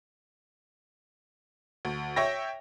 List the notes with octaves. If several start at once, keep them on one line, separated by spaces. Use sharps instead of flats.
D2
C#5 E5 G5 A#6